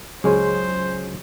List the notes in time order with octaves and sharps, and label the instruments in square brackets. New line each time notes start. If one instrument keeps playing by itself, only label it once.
[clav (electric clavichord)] C#2 G#3 C#4 [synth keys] F#3 [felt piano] G#4 [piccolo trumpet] C5